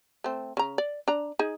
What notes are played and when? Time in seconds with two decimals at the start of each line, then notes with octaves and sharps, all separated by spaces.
0.24 A3 C4
0.57 C#3 A#5
0.78 D5
1.08 D4 A#5
1.39 D#4 G#4